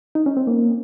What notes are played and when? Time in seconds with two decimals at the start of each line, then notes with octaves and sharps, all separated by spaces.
0.15 D#4
0.26 C#4
0.37 C4
0.47 A#3